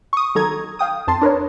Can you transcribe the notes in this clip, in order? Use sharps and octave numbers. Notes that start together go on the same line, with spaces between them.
C#6 D#6
D#3 F#3 A4 A#5 G#6
F5 G5 D#6
F2 A5 C6
D4 A#4 B4 C#5